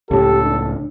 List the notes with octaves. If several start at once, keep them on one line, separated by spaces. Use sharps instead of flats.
C#2 A2 G4 A4
D4